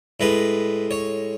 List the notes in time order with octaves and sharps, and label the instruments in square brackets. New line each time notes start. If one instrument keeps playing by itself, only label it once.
[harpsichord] A2 G#3 B4
C#5